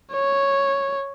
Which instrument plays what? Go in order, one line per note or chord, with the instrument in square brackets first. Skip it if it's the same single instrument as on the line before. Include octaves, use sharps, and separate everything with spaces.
[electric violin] C#5